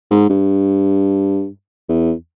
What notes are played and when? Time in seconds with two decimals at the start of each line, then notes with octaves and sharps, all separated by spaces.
0.11 G#2
0.29 G2
1.89 E2